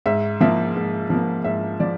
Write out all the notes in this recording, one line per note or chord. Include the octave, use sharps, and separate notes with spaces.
G#2 E5
F3 A#3 E5
G#2
F3 A#3
G#2 E5
F3 D5